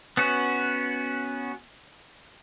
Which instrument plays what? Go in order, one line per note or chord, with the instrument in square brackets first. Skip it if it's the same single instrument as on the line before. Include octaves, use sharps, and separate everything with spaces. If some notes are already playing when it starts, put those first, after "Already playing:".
[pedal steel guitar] B3 C#4 F#4